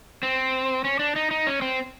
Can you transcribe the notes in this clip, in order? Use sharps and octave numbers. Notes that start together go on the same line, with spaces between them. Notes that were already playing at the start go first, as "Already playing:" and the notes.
C4
C#4
D4
D#4
D#4
C#4
C4